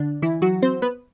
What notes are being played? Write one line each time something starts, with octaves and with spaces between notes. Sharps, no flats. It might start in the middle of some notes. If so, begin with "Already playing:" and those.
Already playing: D3 D4
E3 E4
F#3 F#4
C4 C5
B3 B4